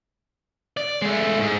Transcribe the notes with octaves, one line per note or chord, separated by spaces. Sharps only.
D5
G#3 A3
G#2